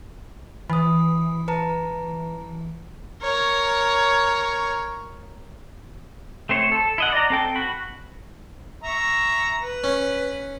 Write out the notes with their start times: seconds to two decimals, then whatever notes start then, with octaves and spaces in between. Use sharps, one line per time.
0.70 E3 B5 D#6
1.48 B4 A5 A#5
3.22 A#4 C#5
6.49 A3 C4 C5 C#5
6.72 A4
6.98 E4 D#5 F#5
7.12 D5 D#5 A#5
7.30 C4 A4 G5
7.56 F#4 B5
8.83 E5 A#5 C#6
9.60 B4
9.84 C#4